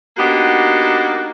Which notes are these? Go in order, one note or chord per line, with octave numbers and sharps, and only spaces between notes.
A#3 B3 D4 D#4 F#4 G4